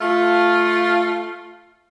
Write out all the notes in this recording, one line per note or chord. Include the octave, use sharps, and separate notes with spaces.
A3 F4